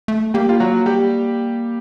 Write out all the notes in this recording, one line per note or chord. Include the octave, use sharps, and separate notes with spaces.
A3
G3 A#3 G4
F4
F#3 F#4
G3 G4